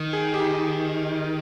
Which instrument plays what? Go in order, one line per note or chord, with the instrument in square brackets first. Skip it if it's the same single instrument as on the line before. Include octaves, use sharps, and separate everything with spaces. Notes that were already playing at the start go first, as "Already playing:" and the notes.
Already playing: [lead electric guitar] D#3
[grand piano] G#4
G4